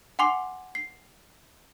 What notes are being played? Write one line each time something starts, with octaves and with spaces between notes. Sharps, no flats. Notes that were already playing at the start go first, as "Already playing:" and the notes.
F#5 G#5 C6 D6 C7
C7